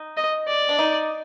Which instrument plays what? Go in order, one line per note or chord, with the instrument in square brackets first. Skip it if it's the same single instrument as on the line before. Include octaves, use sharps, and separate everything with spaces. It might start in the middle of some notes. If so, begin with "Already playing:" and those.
Already playing: [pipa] D#4
[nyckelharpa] D#5
D5
[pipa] D4
D#4